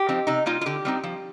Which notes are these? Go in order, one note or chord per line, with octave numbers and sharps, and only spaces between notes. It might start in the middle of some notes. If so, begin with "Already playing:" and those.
Already playing: G4
F3 C4 D#4
C3 D#4
G3 A#3 D#4 F4
F4
D3 G4
G3 C4 D#4
F3